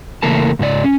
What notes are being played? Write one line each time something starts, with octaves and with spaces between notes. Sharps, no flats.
C#3 E3 A3 A#3 A#4 A5
G#2 C#3 G4 D5
C#4